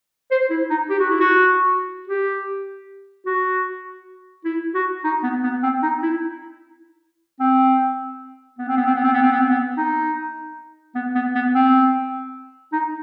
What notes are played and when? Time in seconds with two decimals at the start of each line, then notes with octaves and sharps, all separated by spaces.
0.31 C5
0.50 E4
0.70 D#4
0.90 G4
0.99 F#4
1.10 E4
1.20 F#4
2.08 G4
3.26 F#4
4.45 E4
4.74 F#4
5.04 D#4
5.23 B3
5.43 B3
5.63 C4
5.83 D#4
6.03 E4
7.40 C4
8.58 B3
8.68 C4
8.77 B3
8.86 C4
8.95 B3
9.04 C4
9.13 B3
9.22 C4
9.31 B3
9.40 C4
9.50 B3
9.77 D#4
10.95 B3
11.15 B3
11.35 B3
11.55 C4
12.73 D#4